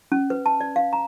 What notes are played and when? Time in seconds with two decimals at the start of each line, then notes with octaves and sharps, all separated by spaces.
0.12 C#4
0.30 B4
0.46 A5
0.61 D5
0.76 F5
0.93 A#5